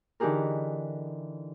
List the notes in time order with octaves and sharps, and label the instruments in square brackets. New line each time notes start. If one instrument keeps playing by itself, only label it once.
[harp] D3 E3 D#4 G4 G#4 A#4